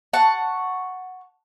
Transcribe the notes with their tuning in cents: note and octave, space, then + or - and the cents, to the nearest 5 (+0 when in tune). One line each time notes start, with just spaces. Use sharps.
F#5 +0 A5 +10 C#6 +0